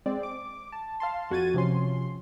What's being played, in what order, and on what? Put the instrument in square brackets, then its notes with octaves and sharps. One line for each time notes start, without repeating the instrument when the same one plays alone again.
[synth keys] G#3 C4 D5
D6
A5
F5 A5 C6
F2 F#4 F#5 G#6 A6 D#7
C3 F3 C#4 C6